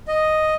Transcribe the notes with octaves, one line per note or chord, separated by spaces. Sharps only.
D#5